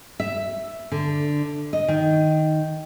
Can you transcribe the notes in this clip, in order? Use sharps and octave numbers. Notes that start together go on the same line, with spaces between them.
E5
D3
D#5
D#3